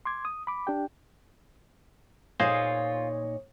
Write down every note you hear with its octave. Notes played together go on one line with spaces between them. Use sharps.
C6 D6 G#6
D#6
B5 D6
D4 G4 G5
A#2 D#4 F4 G#4 C5 C#5 D#5